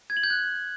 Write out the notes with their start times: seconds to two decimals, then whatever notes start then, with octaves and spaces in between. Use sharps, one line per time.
0.10 G#6
0.17 F#7
0.23 G6
0.30 F#6